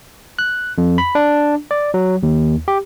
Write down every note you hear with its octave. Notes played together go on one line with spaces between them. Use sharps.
F#6
F2
B5
D4
D5
F#3
D#2
G4